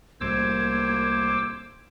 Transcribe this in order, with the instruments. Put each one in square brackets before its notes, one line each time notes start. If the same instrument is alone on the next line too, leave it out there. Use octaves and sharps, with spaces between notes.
[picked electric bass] C2 A2 G3 [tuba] A#3 [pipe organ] C5 D6 E6 [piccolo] G#6